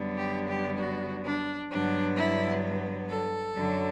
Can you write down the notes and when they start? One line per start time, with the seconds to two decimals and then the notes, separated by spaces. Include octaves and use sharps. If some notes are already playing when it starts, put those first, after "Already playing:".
Already playing: F#2 D3 G3 B3
0.17 G4
0.48 G4
0.79 F#4
1.25 D4
1.71 G2 D3 F#3 B3 D4
2.17 E4
3.09 A4
3.56 F#2 D3 F#3